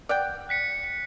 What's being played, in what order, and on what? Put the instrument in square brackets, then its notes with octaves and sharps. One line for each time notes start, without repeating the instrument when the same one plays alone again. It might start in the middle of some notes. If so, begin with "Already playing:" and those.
[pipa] D5 F#5 G5
[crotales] F#6 B6 C#7
C#7